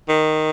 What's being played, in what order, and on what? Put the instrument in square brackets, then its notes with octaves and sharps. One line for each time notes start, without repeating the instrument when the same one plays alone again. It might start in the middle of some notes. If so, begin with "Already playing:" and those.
[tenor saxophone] D#3